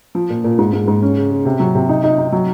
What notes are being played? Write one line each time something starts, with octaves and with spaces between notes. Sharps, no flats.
F3
A#2
A#2
G#2
G#2
G#2
C#4
C#3
C#3
C3
F#3
C3
D#4
D#4
D#4
F#3